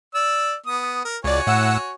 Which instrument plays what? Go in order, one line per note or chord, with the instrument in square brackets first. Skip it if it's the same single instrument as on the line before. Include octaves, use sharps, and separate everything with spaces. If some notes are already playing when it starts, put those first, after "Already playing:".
[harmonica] D5 E6
B3 D#6
A#4
[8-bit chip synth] C#2 D5 [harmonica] F#4 C#5 G#5
[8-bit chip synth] A2 F#5 E6